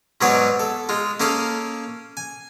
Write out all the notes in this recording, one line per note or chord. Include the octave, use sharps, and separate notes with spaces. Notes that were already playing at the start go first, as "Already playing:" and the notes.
G#2 B2 F#3 G#4 C#5 D5
A4
G#3 F4
A#3 C#4 A4 F5 D#6
G#5